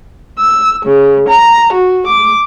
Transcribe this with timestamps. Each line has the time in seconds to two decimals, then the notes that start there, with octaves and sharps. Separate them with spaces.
0.37 E6
0.84 C#3
1.27 A#5
1.73 F#4
2.06 D6